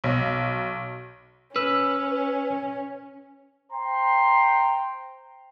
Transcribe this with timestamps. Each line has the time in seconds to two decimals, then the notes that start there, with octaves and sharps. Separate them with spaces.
0.04 B1
1.56 C#4 B4 E6 F6
3.72 C5 G5 A#5 C6